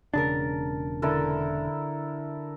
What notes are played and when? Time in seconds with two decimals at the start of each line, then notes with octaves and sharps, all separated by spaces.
0.14 E1 C#3 D4 A#4 A5
1.02 D3 E4 A4 A#4